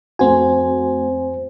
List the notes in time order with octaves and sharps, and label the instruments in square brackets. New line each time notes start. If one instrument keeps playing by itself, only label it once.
[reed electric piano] F2 C5 G#5 [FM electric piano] A3 C4 F#4